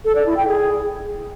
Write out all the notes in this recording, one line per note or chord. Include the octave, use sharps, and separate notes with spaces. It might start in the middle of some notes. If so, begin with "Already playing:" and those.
A4
D5
E4
G5
G#4